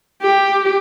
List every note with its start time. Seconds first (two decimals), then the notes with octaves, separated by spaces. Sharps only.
0.22 G4